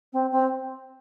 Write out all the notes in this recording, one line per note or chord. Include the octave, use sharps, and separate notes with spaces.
C4
C4